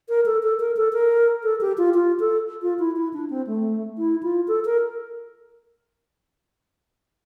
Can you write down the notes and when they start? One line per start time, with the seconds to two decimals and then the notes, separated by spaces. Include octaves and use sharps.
0.09 A#4
0.26 A4
0.43 A4
0.60 A#4
0.76 A4
0.93 A#4
1.44 A4
1.61 G4
1.78 F4
1.94 F4
2.20 A4
2.62 F4
2.79 E4
2.96 E4
3.13 D4
3.30 C4
3.47 A3
3.98 E4
4.23 F4
4.48 A4
4.65 A#4